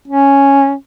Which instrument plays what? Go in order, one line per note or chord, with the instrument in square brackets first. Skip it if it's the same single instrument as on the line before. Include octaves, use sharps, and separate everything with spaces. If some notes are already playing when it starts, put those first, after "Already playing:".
[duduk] C#4